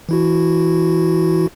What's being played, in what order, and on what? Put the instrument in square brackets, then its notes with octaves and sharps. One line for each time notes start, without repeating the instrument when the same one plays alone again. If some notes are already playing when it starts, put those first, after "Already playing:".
[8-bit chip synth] E3 E4 F#4